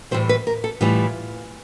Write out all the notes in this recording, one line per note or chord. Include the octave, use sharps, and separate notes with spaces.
A2 E3 G3 C5
B4
A#4
A4
A2 E3 G3 F4